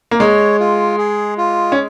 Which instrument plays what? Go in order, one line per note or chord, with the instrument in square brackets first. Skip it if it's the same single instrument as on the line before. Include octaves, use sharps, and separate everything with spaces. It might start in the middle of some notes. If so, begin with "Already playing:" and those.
[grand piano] A#3
[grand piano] G#3 [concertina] C#5
[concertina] F4
G#4
F4
[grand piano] C#4